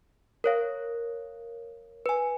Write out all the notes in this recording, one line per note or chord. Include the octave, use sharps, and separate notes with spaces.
A#4 C#5 F5
B4 G#5